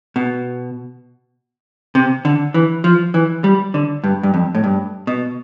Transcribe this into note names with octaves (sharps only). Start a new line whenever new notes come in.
B2
C3
D3
E3
F3
E3
G3
D3
G2
G2
F2
A2
G2
B2